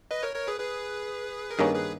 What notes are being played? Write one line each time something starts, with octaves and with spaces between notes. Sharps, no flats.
B4 D#5
A#4 C#5
A#4 C#5
G#4 B4
G#4 B4
A#4
G2 D#3 A#3 C#4 G#4 B4
G#4 B4